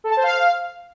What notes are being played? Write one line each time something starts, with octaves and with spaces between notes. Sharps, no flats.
A4
A5
C5
F5